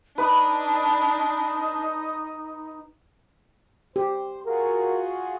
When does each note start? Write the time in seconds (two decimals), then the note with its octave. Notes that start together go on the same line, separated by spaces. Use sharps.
0.18 D4 D#4 B4 B5 D#6
3.96 G4 C5
4.46 F4 F#4 G#4 A#4